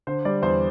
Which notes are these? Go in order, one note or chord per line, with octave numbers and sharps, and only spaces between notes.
D3 C5
G3 D5
E2 C5